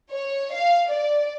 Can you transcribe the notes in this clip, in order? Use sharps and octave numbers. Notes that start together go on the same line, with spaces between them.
C#5
F5
D5